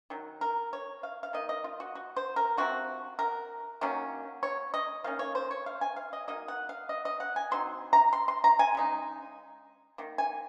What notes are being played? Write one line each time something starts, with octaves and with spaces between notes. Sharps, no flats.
D#3 F#3
A#4
C#5
F5
F5
D#3 A#3 D#5
D#5
F4
F#4
F#4
C5
A#4
C3 F3 C4 F#4
A#4
D#3 F#3 A#3 C#4
C#5
D#5
D#3 A#3 C#4 F5
C#5
C5
C#5
F5
G#5
F5
D#5
F#3 A#3 D#4 D#5
F#5
F5
D#5
D#5
F#5
G#5
F#3 C4 D#4 C6
A#5
C6
C6
A#5
G#5
C#3 G#3 D#4
D#3 A#3
G#5